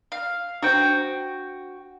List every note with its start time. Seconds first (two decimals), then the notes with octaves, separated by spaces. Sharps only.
0.12 F5
0.63 D4 F#4 C5 G5